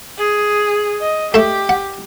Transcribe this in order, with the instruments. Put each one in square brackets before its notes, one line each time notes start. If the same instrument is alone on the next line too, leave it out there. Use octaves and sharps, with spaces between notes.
[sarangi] G#4
D#5
[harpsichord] A3 E5 [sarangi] G4
[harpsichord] F#5